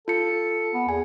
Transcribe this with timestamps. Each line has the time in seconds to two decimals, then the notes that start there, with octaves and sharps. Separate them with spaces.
0.08 F4 A4 C#7
0.74 B3
0.89 E2 G#5